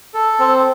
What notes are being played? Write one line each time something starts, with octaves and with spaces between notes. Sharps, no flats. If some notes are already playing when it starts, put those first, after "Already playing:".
A4
C4